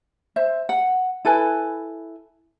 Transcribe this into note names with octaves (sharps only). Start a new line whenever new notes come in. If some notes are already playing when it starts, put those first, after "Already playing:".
C5 E5
F#5
E4 A4 B4 G#5